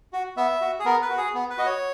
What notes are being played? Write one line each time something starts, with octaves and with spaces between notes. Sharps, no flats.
F#4
B3 E5
F#4
G#4
B3 A#4
B4
F#4
G#4
B3
B4
F#4 D#5
C#5